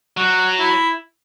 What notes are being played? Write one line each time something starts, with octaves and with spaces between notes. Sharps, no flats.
F#3 F#4
E4